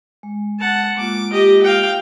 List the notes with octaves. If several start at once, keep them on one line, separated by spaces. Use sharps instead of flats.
G#3
F#5 A5
G#3 A#3 F4 D6
G4 D#5
F5 G5